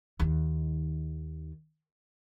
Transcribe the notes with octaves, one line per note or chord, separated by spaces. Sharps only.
D#2 D#3